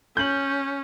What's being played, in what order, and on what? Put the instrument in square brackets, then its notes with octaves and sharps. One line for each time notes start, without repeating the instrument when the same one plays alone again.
[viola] C#4 [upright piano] G6 F#7